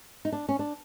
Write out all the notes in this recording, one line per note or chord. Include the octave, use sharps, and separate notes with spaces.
D#4
D4
C#4
D4